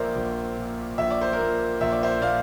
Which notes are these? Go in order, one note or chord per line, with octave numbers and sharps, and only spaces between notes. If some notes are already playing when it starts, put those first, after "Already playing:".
Already playing: A#1 A#2 A#4 C5 D5 E5
A#1
A#2
A#1 E5
D5
C5
A#4 D5
A#2
A#1 E5
D5
C5 E5
A#2 D5 F5